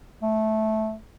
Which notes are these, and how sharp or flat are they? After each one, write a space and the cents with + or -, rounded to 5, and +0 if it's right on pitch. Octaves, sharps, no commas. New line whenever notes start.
A3 -10